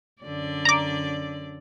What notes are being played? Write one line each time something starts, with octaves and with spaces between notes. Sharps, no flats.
F#2 D3 D5
A#5 D6